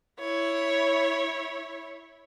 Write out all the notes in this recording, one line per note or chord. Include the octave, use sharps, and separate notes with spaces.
E4 C#5